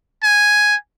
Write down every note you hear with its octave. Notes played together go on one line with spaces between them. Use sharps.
G#5